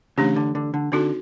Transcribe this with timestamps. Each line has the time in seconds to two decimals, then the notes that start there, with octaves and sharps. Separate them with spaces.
0.18 C#3 E3 A3 D4 G4
0.36 D3
0.55 D3
0.74 D3
0.92 D3 C4 D#4 F#4 A4